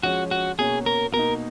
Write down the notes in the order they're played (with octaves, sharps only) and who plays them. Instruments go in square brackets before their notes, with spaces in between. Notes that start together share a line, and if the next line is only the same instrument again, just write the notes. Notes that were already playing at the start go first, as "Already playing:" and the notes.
[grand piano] F3 G#3 C#4 [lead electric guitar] F#4
[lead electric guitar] F#4
[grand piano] B2 A#3 C#4 [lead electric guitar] G#4
[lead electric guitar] A#4
[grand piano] B2 A#3 D#4 [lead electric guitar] A#4